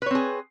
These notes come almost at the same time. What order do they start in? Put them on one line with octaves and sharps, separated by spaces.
B4 C#5 C4 G#4